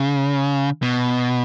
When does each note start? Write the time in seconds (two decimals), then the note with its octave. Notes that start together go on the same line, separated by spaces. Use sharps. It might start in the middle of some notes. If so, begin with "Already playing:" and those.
Already playing: C#3
0.82 B2